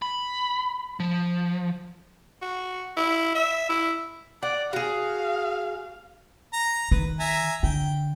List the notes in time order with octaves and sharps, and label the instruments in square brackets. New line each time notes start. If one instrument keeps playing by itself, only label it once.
[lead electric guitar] B5
F3
[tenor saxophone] F#4
E4
E5
E4
[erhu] D5 [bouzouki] F#5
[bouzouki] F#4 G#4 [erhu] F5
[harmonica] A#5
[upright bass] D#3 [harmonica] B4
[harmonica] E5 G#5 A#5
[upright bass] D3 [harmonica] G5